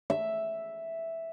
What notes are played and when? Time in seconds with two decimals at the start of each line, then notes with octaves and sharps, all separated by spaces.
0.10 E5